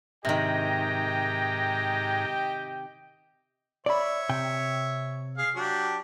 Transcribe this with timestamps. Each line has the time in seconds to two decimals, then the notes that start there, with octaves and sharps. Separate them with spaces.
0.25 G#2 C3 D#3 G4 D#5 G5 A#5
3.86 C#5 D5 E5 B5
4.29 C3 G5
5.37 G#4 F5
5.55 F#3 D4 G4